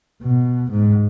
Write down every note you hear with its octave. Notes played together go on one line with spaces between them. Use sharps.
B2
G#2